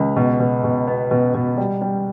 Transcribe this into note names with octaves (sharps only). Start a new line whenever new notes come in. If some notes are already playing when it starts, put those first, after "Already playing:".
Already playing: C#2
B2
B2
B2
B3
B2
B2
G3
G3